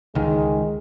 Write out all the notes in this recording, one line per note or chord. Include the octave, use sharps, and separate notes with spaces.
C#2 D#3 G#3